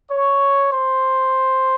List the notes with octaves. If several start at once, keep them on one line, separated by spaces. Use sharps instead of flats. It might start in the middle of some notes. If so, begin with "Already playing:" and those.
C#5
C5